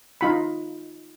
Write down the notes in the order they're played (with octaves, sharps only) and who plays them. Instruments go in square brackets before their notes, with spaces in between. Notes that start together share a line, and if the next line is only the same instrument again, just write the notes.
[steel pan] D#4 F4 B5